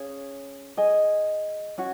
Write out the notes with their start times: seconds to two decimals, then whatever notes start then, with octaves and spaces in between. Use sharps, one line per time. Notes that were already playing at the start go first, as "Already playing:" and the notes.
Already playing: C#4 G#4 C#5 F5
0.77 G#4 D#5 G#5
1.78 C#4 F#4